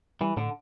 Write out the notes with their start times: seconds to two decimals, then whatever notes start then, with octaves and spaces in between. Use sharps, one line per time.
0.21 E3 G3
0.37 A2 D3